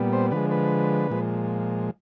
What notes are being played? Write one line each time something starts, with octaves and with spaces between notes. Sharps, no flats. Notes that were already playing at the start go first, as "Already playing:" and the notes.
Already playing: A#2 G3 B3
C5
D3 F3 G#3 B4
B4
A#2 F3 G#3